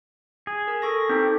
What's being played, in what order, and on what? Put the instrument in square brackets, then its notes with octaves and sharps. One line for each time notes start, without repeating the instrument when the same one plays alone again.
[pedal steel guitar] G#4
[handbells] A#4
A4 C#6 A#6
[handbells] C4 D#4 A4 [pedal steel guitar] G4